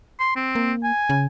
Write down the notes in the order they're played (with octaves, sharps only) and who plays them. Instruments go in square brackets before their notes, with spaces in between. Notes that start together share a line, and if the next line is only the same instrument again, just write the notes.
[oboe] C6
C4
[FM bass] A#3
[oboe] G#5
[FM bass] C#3